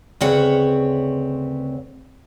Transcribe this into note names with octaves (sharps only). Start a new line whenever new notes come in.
D2 C#3 C4 B4 C#5 F#5